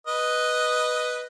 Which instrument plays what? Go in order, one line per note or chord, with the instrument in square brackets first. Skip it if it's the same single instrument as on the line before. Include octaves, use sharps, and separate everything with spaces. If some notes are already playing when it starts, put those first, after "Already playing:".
[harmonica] B4 D#5